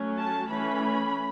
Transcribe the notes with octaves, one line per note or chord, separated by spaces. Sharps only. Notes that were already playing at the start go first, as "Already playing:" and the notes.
Already playing: F#3 A3 C#4
A5
E3 A3 C#4 B5